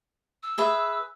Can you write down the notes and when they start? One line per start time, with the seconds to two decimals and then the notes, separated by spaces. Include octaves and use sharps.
0.43 E6
0.58 G#4 B4 E5